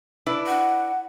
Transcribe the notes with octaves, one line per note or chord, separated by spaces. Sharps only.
D4 E4 B4
F#5